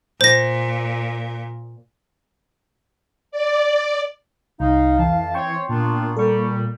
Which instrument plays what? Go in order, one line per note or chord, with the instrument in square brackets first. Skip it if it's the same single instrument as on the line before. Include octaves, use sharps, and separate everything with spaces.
[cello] A#2 [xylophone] C5 A#6
[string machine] D5
[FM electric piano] C2 [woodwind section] D#4 [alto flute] F5
[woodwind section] F2 A5 [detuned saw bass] E3
[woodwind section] C4 C#5 [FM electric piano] G5 C6 C#6
[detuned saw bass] A#2 [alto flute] A#3 [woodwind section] B3 D4 F4
[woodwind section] G3 [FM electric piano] A4 C#6